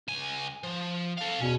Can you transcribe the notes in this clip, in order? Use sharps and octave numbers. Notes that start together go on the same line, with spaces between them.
C#2 G#5
F3
A4 F5
E2 B2 C#4